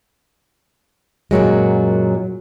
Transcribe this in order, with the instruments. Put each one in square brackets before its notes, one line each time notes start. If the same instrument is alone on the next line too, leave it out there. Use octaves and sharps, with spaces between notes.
[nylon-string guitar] F#2 A#2 F#3 G#3